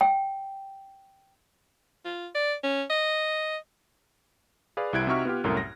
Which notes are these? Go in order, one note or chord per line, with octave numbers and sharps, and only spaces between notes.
G5
F4
D5
C#4
D#5
G#4 B4 D5 F5
C2 C3 E4 F#6 G#6 D7
C3 D#4 F#4 E5 C#6 F6
B3 F4 G4
C2 F#2 A2 A#4 D#6
A#6